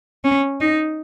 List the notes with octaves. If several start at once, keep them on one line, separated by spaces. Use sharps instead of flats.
C#4
D#4